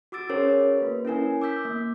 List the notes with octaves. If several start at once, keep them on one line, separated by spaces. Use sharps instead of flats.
F#4 D6 E6 A6 D7
C#4 F#4 G#4 A#4 C5 C#5
A#3 B4
C#4 E4 A#4 G#5
D6 E6 G6 B6
A#3